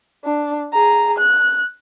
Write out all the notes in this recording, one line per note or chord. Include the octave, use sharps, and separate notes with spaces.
D4
G#4 A#5
F#6